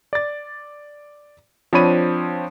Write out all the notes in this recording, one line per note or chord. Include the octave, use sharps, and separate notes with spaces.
D5 A6
F3 C4 D4 C#5 B5 D#7